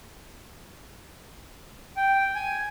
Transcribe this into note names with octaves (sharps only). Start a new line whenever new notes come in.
G5
G#5